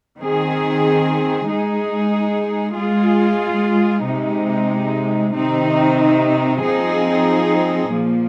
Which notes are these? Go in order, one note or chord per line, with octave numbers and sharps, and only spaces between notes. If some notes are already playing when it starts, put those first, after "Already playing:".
D#3 C4 G#4
G#3 D#4 G#4
G#3 F4 G#4
C3 G#3 D#4
C3 D#3 C4 D#4
F3 C4 D#4 G#4
A#2 F3 A#3